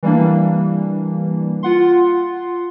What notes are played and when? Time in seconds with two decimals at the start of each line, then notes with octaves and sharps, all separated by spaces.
0.03 E3 G3 A#3 D4
1.63 F4 F#5 C6